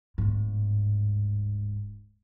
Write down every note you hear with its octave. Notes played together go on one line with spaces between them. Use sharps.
D1 G#2